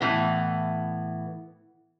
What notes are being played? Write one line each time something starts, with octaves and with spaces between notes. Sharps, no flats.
A2 E3 B3